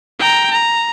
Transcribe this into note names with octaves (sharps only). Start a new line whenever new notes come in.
G5 A#5
A#5